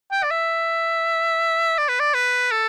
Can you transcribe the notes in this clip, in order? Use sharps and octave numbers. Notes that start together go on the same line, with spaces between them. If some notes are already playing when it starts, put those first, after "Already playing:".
G5
D5
E5
D5
B4
D5
B4
A4